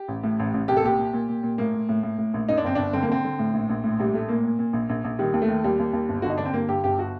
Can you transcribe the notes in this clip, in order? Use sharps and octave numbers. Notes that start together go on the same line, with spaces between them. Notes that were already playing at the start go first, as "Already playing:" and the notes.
Already playing: G4
A1
A2
A1
A1
C2 G4
A4
A#2 G4
A#2
A#2
A#2
A#2
A2 A#3
A2
A2
A2
A2
A#1
F#2 D#4
D4
G1 C4
G1 D4
D3 C4
A#3
D3 C4
D3
A2
A#1
A#1
A2
A#1 G3
A2 A3
A#2 A#3
A#2
A#2
A#1
A#1
A#1
D#3 G3
D#2
A3
D#3
D#2 G3
D#2
D#2
G1
D3 F#4
D#4
D3 D4
C4
G2 A#3
G2 G4
G1 G4
F#4